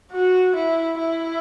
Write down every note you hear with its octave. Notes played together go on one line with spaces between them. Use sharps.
F#4
E4
E4